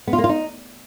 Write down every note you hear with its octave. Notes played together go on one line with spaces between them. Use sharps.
B3
F4
A#3
F4
D#4